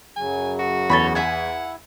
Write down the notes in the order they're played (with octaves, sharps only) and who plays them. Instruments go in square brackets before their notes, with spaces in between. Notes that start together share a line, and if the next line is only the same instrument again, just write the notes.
[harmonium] F#2 C#3 F#3 [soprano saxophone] G#5
[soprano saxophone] F#4
[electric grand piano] E2 [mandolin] A4 C#5 B5
[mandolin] E4 E5 G#5 [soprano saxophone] F#5